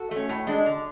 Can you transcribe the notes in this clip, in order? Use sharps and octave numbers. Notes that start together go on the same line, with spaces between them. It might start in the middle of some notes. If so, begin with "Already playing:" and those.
Already playing: F#4 A4
A3 C#4
A2
G#3 D4
D3